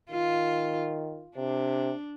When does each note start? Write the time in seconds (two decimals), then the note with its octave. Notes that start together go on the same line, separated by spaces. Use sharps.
0.11 D#3 F4
1.36 C3 D4